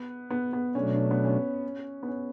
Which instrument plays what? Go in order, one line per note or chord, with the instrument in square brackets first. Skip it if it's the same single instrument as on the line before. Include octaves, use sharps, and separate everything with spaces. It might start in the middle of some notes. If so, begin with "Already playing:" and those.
Already playing: [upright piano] B3
B3
B3
[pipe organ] B2 F#3 A3 D4 [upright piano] C#4
[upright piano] C#4
B3
C#4
B3
C#4